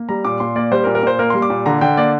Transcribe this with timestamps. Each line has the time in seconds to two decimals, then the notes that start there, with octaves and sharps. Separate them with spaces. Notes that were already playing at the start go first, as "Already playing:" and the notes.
Already playing: A#3
0.09 G3 A#5
0.25 A#2 D6
0.40 A#2 C6
0.56 A#3 D5
0.72 G3 C5
0.84 A#4
0.87 A#2
0.95 A#4
1.03 A#2 C5
1.19 A#3 A#4
1.30 G3 C6
1.42 D6
1.50 A#2
1.66 D3 A#5
1.81 D3 G5
1.97 A#3 D5